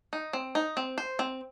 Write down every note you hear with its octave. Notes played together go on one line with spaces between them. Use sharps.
D#4
C4
D#4
C4
C5
C4